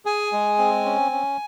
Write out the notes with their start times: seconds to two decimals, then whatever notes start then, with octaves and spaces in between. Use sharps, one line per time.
0.05 G#4 G#5
0.33 G#3
0.58 C4
0.85 C#4
1.12 C#4